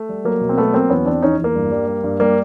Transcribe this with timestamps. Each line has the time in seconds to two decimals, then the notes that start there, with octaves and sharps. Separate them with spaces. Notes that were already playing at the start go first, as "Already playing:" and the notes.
Already playing: A3
0.09 G3
0.24 F#3 A#3
0.41 B2
0.49 C4
0.57 F#3 A3 B3
0.73 F#3 A#3 C4
0.90 E2 B3 C#4
1.06 E2 C4 D4
1.22 E2 C#4 D#4
1.39 E2
1.44 A#3
1.55 G2
1.72 G3
1.87 G3
2.04 G2
2.20 G3 A#3